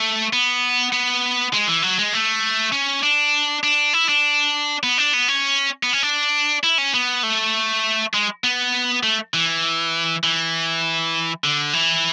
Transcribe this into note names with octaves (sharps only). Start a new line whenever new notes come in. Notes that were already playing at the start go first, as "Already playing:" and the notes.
Already playing: A3
B3
B3
G#3
E3
F#3
G#3
A3
C#4
D4
D4
E4
D4
B3
D4
B3
C#4
B3
C#4
D4
E4
C#4
B3
A3
G#3
B3
A3
E3
E3
D3
E3